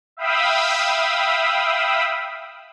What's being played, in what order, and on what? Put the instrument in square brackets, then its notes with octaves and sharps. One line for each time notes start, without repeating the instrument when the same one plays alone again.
[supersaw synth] E5 F5 G5 B5 D#6 E6